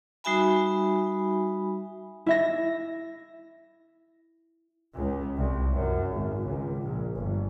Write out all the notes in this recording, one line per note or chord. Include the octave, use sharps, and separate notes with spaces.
G3 D#4 F#4 E5 G#5 B5
E4 E5 A#6
C#2
C2
F#2
G#1
C#2
A#1
G1